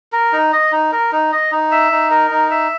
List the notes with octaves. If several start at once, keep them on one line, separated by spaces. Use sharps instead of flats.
A#4
D#4
D#5
D#4
A#4
D#4
D#5
D#4
E5
D#4
A#4
D#4
E5